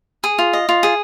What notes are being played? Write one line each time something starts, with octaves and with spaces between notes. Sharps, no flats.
G#4
F4
D#5
F4
G#4